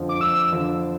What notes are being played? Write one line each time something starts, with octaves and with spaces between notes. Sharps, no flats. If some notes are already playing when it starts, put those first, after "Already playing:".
Already playing: F2 D3 F3
D6
F2 E6
D3 F3